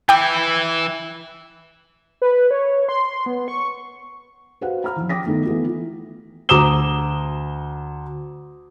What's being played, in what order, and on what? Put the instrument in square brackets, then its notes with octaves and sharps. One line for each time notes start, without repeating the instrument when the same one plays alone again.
[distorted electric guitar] E3 E4 [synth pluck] G5 D6
[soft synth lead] B4
C#5
C6
B3
C#6
[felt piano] F#4 B4 C5 F5 F#5
A#5 B5 F6
E3 F3
G5 D6 D#6 A#6 B6
D#3 A3 B3
E3 A3 B3 F4
[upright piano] D2 A#5 D6 D#6 E7 G7